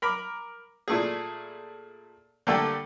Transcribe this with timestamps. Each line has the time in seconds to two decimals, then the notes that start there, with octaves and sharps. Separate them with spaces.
0.02 A#4 B5 D6
0.88 A#2 A3 G#4
2.47 D3 G3 A3 A#3 G4 A4